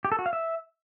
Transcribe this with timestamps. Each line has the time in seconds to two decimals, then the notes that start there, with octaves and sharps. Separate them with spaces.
0.05 G4
0.12 A4
0.19 F#4
0.26 F5
0.33 E5